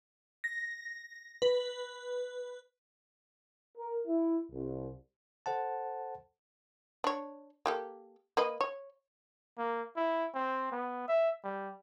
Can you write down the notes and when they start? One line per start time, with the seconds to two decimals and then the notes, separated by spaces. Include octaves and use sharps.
0.44 A#6
1.42 B4
3.77 A#4
4.08 E4
4.52 C2
5.46 A4 C5 F#5 A5
7.04 D4 C#5
7.66 A#3 G4 A4
8.37 A#3 B4 D#5
8.61 C#5
9.58 A#3
9.96 E4
10.34 C4
10.72 B3
11.08 E5
11.44 G3